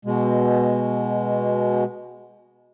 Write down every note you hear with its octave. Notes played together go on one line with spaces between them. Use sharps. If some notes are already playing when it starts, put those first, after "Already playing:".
B2 G#3